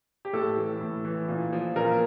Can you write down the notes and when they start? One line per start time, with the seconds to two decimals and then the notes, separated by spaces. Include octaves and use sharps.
0.25 G4
0.33 A2 A4
0.57 E3
0.81 A2
1.04 E3
1.28 A#2
1.53 F3
1.76 A#2 A#4